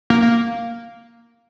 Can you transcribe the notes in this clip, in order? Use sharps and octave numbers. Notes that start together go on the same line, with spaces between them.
A#3
A#3